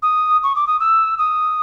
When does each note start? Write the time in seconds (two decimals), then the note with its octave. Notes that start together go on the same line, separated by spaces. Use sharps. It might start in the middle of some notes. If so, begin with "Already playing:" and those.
0.03 D#6
0.43 C#6
0.56 D6
0.67 D#6
0.80 E6
1.18 D#6